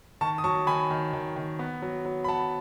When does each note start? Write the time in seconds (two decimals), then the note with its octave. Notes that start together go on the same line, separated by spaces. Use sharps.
0.21 D#3 A5 C#6
0.38 D#6
0.44 F#3 A5 C#6
0.67 D#3 G#5 B5
0.90 D#3
1.13 D#3
1.36 D#3
1.59 B3
1.82 F#3
2.05 F#3
2.24 B5
2.28 F#3 F#5 A5